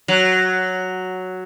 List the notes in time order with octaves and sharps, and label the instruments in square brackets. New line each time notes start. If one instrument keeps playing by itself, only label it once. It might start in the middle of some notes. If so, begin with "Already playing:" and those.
[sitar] F#3